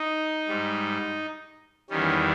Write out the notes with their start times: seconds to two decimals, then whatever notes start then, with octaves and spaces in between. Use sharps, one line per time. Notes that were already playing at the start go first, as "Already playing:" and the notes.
Already playing: D#4
0.48 G#2 G3
1.90 E2 D#3 G3 C#4